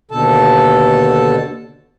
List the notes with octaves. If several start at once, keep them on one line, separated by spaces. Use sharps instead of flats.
D#2 B2 D3 A4 A5